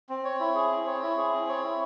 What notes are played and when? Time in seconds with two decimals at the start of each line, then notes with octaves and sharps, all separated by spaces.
0.09 C4
0.25 C#5
0.40 E4
0.55 G#4
0.71 C4
0.87 C#5
1.02 E4
1.18 G#4
1.33 C4
1.48 C#5
1.64 E4